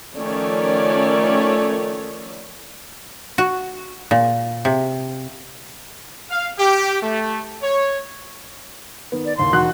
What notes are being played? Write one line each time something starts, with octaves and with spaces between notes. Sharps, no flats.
D#3 F3 A3 C#4 C#5 D5
F#4
A#2
C3
F5
G4
A3
C#5
D#3 B3
D5
D#2 A2 C6
E1 D#4 F#4 F#6